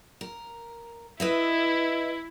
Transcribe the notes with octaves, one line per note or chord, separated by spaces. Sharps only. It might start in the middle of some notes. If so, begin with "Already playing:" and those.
A#4
E4 B4 D#5 E5